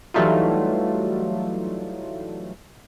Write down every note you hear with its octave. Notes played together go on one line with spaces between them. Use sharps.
E3 F#3 G3 A3 D#4 F4